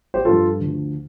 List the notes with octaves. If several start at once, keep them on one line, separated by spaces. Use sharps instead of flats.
G4 C5
G2 F3 F4 A4
D2 D3 F3